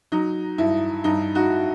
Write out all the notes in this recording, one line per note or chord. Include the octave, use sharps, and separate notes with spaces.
F#3 D#4
G2 E4
G2 D#4
D#4 F#4